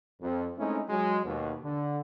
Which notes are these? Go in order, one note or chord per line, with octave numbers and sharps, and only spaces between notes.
F2
G#3 A3 C4 C#4 D#4 E4
F#3 G#3
D#2 B2
D3